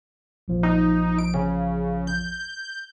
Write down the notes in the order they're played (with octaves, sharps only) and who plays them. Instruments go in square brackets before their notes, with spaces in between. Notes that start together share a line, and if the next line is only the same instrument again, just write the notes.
[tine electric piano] A#1 F3
[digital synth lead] D#4
D7
C#3
G6